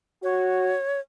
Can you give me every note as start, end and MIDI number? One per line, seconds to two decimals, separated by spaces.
0.23 0.74 66
0.23 1.00 73